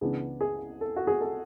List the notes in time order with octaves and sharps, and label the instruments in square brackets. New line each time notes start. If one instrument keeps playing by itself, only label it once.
[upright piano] C#2 C#3 E3 B3 D4 G#4
G#4
A4
F#4
G#4
A4